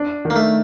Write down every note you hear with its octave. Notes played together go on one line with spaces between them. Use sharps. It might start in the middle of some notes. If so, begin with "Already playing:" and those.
Already playing: D4
D#3
A#3
A3